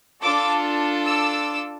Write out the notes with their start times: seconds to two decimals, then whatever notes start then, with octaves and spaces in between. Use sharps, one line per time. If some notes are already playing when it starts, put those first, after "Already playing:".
0.21 D4 F4 A4 D6 E6
1.05 D6 E6